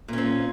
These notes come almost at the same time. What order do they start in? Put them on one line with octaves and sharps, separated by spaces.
A#2 C#4 C4